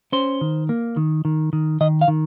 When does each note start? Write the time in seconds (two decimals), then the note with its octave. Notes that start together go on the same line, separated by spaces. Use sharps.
0.12 C#4 C5
0.41 D#3
0.69 A#3
0.97 D#3
1.25 D#3
1.53 D#3
1.81 D#3 D#5
2.01 F5
2.08 D#3